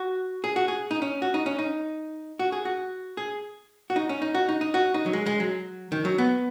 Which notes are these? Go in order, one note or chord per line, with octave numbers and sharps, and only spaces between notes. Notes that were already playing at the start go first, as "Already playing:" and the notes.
Already playing: F#4
G#4
F#4
G#4
D#4
C#4
F#4
D#4
C#4
D#4
F#4
G#4
F#4
G#4
F#4
D#4
C#4
D#4
F#4
D#4
D#4
F#4
D#4
F#3
G#3
G#3
F#3
D#3
F#3
B3